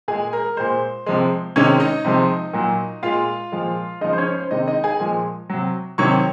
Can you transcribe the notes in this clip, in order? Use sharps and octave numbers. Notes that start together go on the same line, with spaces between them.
A#2 G#3 G#4 G#5
A#4
A#2 G#3 C5
C3 F3 G#3
C3 D#3 G#3 C#4 C#5
D#4 D#5
C3 F3 G#3
A#2 F#3
A#2 G#3 F4 F5
A#2 F3 G#3
C#3 F3 G#3 D#4 D#5
C5
C#4 C#5
C5
C3 D#3 G#3 D#4 D#5
D#4 D#5
G#4 G#5
A#2 F3 G#3
C3 F#3
C3 D#3 F#3 C#5 C#6